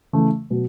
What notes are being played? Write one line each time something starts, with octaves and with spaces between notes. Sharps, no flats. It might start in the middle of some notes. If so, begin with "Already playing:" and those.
C#3 E3 A3
B2 F#3